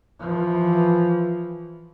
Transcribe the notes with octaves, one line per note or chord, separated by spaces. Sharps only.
E3 F3